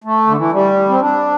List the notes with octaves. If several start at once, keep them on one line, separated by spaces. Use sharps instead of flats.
A3
D3
E3
G3
C4
D4